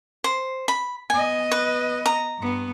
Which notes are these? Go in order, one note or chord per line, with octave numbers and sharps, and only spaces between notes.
C5
B5
B3 D#5 G#5
B4
A#5
G2 B3